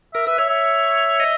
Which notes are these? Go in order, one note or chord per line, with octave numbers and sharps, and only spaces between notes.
A#4 E5
B4 E5
C#5 E5
E5
D#5